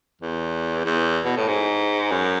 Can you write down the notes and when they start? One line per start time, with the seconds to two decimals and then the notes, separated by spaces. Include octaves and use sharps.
0.21 E2
0.85 E2
1.24 B2
1.37 A2
1.48 G#2
2.12 F#2